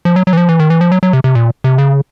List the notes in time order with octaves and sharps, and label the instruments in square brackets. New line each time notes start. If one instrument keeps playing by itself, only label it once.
[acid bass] F3
F#3
F#3
E3
F3
E3
D#3
E3
F3
F#3
F#3
C3
C3
A#2
C3
C#3